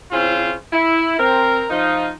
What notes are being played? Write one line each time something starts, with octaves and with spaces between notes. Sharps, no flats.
C#3 C4 C#4 E4 F4 C5
E4
C4 A#4
F3 D#4 F4